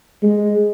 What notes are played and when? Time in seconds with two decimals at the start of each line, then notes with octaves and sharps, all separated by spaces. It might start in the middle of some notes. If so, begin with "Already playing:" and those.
0.23 G#3